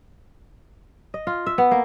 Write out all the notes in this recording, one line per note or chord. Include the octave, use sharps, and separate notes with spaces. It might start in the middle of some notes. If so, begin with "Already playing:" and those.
D#5
F4
E5
B3
A#3